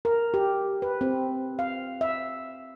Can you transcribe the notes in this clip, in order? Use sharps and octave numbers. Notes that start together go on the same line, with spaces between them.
A#4
G4
B4
C4
F5
E5